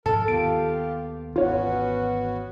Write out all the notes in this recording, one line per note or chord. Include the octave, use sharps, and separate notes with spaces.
G#2 F3 A4 A#4
D#2 D#3 B3 F4 G4 D7
G#1 E2 B3 C#4 F4 F#4 C#5